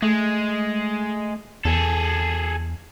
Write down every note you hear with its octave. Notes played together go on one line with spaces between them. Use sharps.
G#3 A3
E2 G#4 A4